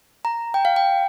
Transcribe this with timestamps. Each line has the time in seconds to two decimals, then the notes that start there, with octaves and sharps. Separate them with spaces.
0.25 A#5
0.54 G5
0.65 F5
0.76 G5